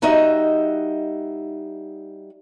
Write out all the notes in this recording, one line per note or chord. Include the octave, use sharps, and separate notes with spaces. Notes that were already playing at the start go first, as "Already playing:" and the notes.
G3 D#4 F#4 D#5 E5